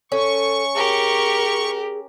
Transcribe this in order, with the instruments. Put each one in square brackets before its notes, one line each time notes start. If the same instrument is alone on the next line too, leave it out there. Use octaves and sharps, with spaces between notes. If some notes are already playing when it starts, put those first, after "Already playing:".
[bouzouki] C#4 [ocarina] A4 [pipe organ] C#6
[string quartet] G4 A#4 [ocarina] G#4